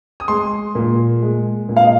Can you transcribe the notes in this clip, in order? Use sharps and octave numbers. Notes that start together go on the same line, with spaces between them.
D#6
G#3 C6
A#2
G#3
A#2
F5
D#5